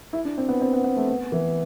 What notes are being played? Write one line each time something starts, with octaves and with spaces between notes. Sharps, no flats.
E4
D4
C4
B3
C4
B3
B3
A3
B3
E3